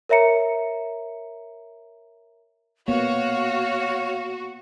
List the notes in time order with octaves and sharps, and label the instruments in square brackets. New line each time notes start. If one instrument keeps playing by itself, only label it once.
[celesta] A#4 C#5 E5 A#5 C#7
[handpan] A#3 B3 [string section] F#4 [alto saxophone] C#5 [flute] F5